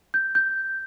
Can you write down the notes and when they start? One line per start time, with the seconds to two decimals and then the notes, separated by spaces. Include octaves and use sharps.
0.14 G6
0.35 G6